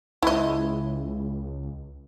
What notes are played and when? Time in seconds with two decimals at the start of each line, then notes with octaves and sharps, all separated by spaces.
0.22 C#2 E4 D#5